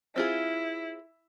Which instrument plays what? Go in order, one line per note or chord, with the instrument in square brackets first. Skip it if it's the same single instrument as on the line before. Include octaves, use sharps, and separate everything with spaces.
[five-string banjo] C4 F4 G#4 [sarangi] E4